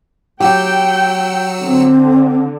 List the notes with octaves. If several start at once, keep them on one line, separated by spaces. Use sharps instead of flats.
F#3 G4 G5 E6 C#7
D3 C4